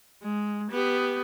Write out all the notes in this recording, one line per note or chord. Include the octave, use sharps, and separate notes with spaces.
G#3
B3 G4